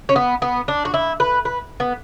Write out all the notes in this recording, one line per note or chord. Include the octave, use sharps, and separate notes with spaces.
C#4
B3
B3
D4
F#4
E4
B4
B4
B3